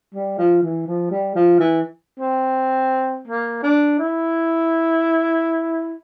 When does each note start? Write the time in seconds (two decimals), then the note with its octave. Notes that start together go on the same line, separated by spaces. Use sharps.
0.15 G3
0.38 F3
0.63 E3
0.86 F3
1.11 G3
1.35 F3
1.59 E3
2.20 C4
3.28 A#3
3.63 D4
3.99 E4